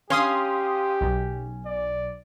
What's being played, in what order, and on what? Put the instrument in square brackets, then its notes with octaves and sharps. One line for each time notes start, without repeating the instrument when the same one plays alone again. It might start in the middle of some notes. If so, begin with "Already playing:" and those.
[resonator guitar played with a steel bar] C#4 [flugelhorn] G4 [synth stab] F5 C6 D#6
[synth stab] B1
[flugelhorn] D5